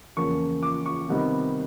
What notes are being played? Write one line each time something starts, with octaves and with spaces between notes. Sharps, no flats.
E2 C#3 F3 A#3 C#4 C#6
D6
C#6
C3 D#3 G3 B3 D#4